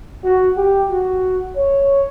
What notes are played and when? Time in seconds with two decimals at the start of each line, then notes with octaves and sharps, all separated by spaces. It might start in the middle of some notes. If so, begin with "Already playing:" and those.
0.24 F#4
0.57 G4
0.90 F#4
1.56 C#5